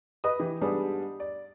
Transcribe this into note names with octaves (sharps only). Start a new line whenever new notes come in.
B4 D#5 D#6
E3 G4
G#2 G3 B3 D4 G#4
D5